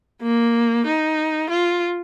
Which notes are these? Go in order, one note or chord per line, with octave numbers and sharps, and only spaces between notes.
A#3
D#4
F4